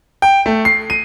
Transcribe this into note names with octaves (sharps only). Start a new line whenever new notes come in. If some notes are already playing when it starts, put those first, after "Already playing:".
G5
A3
C7
D#7